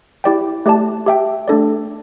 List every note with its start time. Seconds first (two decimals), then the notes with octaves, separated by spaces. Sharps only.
0.24 E4 G4 D5 G5
0.66 A3 G4 D5 A5
1.06 G4 E5 G5
1.48 A3 D4 A4 D5